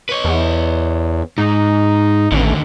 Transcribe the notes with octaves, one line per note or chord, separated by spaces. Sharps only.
B4 C#5
E2
G#2 D#4
A1 D#2 D3